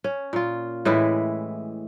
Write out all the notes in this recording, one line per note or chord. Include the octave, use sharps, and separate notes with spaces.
C#4
A#2 F4
A2 E3 G#3 E4